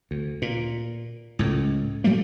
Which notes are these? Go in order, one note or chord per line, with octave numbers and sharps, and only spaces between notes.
D2
A#2
C#2 A2
F#3 G3 A3 A#3